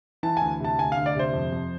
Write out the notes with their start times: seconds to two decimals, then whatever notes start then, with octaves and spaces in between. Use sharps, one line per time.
0.23 E3 A5
0.37 D2 G#5
0.60 C3 A5
0.79 D2 G#5
0.92 F5
0.97 D2
1.06 D5
1.15 C3 C5
1.33 F2
1.52 F2